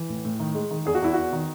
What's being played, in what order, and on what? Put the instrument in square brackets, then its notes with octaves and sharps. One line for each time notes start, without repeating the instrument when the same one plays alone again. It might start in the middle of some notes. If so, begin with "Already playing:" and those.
Already playing: [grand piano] E3
A2
A2
D#3
G#3
D#3
E2 G#4
F#4
E2 E4
E2 F#4
D#3